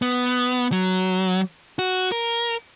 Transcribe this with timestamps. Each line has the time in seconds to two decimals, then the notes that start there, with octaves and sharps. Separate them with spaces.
0.02 B3
0.72 F#3
1.79 F#4
2.12 A#4